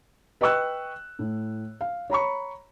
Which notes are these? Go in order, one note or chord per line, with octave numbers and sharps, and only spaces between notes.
B4 D#5 G5 C#6 E6 F#6
A2
F5
C#5 A#5 B5 C#6